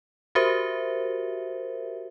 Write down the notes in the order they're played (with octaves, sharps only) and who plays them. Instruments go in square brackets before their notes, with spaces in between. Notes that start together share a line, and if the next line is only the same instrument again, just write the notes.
[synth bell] F#4 G4 A#4 C5 E5